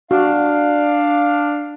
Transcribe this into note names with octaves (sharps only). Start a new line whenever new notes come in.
D4 F#4 F5